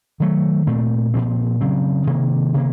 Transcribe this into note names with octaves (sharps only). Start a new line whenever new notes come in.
D#3 F#3 A3
A#2 A3 C4
A#2 F3 C4
C#3 F#3 C4
C3 D#3 A#3
C3 D#3 A#3